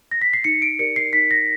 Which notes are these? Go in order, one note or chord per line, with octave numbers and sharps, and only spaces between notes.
A#6
B6
C7
D#4 C#7
D7
G4 A#4 D5 C#7
C7
D#4 B6
A#6